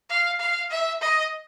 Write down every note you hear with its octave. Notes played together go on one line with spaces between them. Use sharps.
F5
F5
E5
D#5